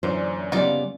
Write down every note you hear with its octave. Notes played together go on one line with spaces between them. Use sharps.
F#2 A#2 D3 E3 C#4 C5
C#3 G3 B3 D#4 F4 D5